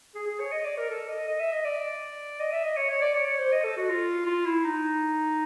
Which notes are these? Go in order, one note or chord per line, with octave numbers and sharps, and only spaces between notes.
G#4
G#4
C#5
D#5
D5
A#4
A4
D#5
D#5
E5
D#5
D5
D#5
E5
D#5
C#5
C#5
D5
C#5
C#5
C5
D#5
A4
F#4
F4
F4
E4
D#4